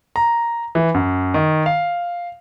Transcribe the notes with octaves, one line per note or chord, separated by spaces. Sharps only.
A#5
E3
F#2
D#3
F5